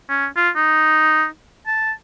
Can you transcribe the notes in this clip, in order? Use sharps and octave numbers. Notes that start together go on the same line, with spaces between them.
C#4
F4
D#4
A5